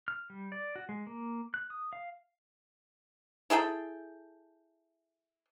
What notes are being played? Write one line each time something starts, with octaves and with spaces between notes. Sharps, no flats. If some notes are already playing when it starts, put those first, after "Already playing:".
F6
G3
D5
F#4
G#3
A#3
F#6
D#6
F5
E4 G#4 A4 G5